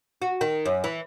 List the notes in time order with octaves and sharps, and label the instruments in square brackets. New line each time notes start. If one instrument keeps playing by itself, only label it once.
[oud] F#4
D#3
F#2
E3